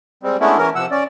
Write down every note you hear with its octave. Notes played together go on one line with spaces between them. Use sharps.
G3 G#3 C4
G#3 A3 B3 C#4 D4 E4
E3 C#4 A#4
C3 F3 F#5 E6
C#4 D5